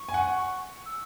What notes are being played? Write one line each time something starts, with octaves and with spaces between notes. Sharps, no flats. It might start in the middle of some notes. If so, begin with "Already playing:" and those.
Already playing: C#6
G#5
F#5
E6